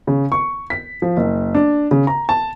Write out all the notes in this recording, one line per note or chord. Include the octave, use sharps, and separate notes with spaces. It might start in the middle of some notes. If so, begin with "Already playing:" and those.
C#3
C#6
B6
F3
F#1
D4
C#3
A#5
A5